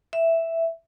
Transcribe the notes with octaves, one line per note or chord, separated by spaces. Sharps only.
E5